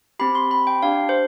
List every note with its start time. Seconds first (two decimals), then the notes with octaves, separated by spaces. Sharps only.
0.19 C4 G4 B5
0.35 C6
0.51 B5
0.67 G5
0.83 D4 G4 F5
1.09 C5